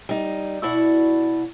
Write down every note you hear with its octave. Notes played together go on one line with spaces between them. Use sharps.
G3 D#4
B2 E4 F#4 D5 F#5